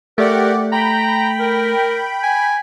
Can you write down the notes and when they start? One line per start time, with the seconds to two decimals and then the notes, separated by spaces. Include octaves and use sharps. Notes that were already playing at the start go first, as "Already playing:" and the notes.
0.18 A3 G4 A#4 D5 F#5
0.72 G5 A#5 B5
1.40 A#4
2.23 G#5